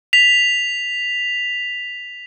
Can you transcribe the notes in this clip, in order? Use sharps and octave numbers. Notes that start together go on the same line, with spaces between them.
B6 F7